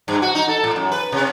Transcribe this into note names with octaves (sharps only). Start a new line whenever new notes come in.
G2
F#4
D#4
A4
A2
F#2
B4
C3